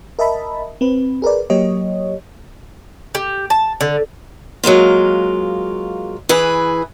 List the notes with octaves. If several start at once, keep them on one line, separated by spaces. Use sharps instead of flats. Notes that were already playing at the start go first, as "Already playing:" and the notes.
A#4 D#5 E5 A5 B5
C4 B4
G#4 A#4 B4 D5
F#3 A#3 G4 C#5 D#5
G4
A5
D3
F#3 G#3 A#3 F4
E3 G#4 B4